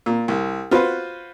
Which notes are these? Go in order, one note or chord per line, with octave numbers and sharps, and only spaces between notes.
A#2
C2
F4 F#4 B4 C5